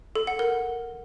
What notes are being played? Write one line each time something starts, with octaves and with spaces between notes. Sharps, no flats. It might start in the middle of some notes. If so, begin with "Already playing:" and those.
A4
F#5
A#4